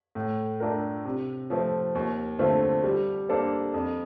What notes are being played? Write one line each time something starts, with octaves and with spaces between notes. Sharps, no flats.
A2
A3 D4 F4 A#4
C3
F3 A3 C4
D#2
D3 A3 C4 F4
G3
A#3 D4 A4 C5
F2